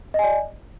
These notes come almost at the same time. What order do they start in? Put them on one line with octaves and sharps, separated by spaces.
D#5 G#5 D5